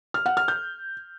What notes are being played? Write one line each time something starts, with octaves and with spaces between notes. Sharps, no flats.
F6
F#5
F6
G6